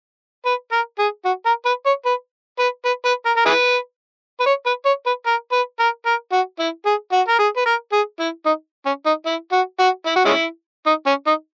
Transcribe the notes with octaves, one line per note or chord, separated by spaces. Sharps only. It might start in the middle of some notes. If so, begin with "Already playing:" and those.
B4
A#4
G#4
F#4
A#4
B4
C#5
B4
B4
B4
B4
A#4
A#4
E4 G#4 B4
B4
C#5
B4
C#5
B4
A#4
B4
A#4
A#4
F#4
E4
G#4
F#4
A#4
G#4
B4
A#4
G#4
E4
D#4
C#4
D#4
E4
F#4
F#4
E4
F#4
G#3 C#4 E4
D#4
C#4
D#4